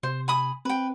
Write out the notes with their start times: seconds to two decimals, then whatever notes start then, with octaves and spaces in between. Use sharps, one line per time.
0.03 C3 C5
0.28 G#5 B5 D#6
0.65 C4 B4 G5